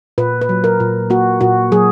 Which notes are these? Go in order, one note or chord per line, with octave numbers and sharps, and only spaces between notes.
A#2 B4
B4
F#3
A#4
A#2
A#3 F#4
A#2 F#4
F#3 G#4